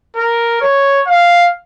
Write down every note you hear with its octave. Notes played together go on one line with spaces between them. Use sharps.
A#4
C#5
F5